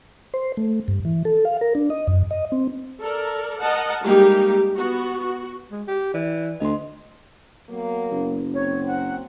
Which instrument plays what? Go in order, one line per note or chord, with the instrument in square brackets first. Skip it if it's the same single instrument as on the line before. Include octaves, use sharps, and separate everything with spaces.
[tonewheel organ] C5
A3
G2
E3
A4
F5
A#4
D4
D#5
F#2
D#5
C4
[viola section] A4 A#4 D5
A#4 D#5 F#5 A5
G3 G#3 A#3 D#4 G4
B3 F#4
F#4
[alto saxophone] G#3
G4
[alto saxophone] E3 [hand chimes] D5
[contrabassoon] D2 [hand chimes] D#5 C6
[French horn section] F#3 A#3 B3
[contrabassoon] F#1
[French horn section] F#3 C4 [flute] C#5
[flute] F#5